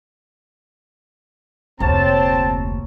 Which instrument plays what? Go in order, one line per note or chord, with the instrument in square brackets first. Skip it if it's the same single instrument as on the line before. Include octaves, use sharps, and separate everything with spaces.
[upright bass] F1 D2 [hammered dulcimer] A#3 C#5 [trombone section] C4 [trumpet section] A5